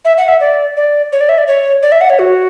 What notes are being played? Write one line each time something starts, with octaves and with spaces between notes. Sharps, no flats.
E5
F#5
E5
D5
D5
C#5
D5
E5
D5
C#5
D5
E5
F#5
C#5
F#4